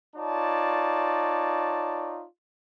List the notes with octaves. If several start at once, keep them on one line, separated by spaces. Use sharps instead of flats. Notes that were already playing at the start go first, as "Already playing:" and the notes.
D#4 F4 C#5 D5 A5